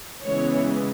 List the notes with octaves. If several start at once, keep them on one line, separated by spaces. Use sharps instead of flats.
C#3 E3 G#3 B3 C#5